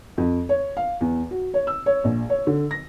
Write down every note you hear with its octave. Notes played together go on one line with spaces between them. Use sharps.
F2
C#5
F5
E2
F#4
C#5
E6
C#5
A#1
C#5
D3
A#6